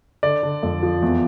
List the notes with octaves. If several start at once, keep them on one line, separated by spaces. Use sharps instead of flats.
D3 D5
D3
F2
F3
E2